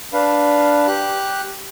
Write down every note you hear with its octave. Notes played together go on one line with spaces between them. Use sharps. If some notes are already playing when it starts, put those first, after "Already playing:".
D4 B4 F5
G4 F#6